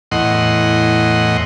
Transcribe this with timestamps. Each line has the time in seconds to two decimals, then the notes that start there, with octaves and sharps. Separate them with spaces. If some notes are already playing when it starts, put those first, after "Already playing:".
0.12 E2 A2 D#5 F#5 C6